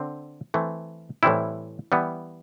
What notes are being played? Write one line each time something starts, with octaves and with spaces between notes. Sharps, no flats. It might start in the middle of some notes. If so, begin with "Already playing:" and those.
Already playing: D3 C4
E3 A3 C4
A2 E3 G3 C4 E4
E3 G3 B3